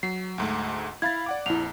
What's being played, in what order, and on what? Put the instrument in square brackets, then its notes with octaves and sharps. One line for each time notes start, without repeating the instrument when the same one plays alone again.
[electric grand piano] F#3 [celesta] C7
[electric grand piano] D2 G#2 A3
[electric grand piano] E4 F5 B5 [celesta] G#6 A6
[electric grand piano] D5 F#5 D6
[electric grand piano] A#1 F2 [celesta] E4 F7